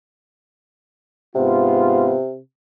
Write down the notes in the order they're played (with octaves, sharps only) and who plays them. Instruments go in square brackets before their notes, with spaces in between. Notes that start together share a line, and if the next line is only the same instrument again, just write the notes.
[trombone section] G#2 B3 F4 [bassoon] C3